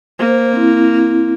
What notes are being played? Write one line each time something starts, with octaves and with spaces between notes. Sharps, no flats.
A#3 C5
C4 E4